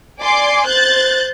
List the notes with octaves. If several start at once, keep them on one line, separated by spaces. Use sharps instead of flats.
D5 G#5 C6 D6
C5 F#6 G6 A6